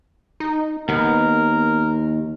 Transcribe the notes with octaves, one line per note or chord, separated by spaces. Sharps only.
D#4
D#2 B3 A#4